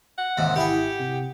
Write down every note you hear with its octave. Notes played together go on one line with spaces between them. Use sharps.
F#5
D#2 G#2 C3
G#1 E4 G4 G#4 F#5
C3